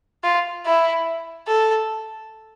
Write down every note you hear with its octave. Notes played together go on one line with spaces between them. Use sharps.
F4
E4
A4